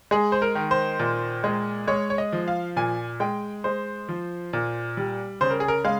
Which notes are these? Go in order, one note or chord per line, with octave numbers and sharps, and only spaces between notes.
G#3 G#4
C5
A#4
D#3
C5
A#2
G#3
G#3 C#5
C#5
D#5
F3
F5
A#2 G#5
G#3 G5
G#3 C5
F3
A#2
G3
C#3 C5
A#4
G#4
A#4
G#3 F5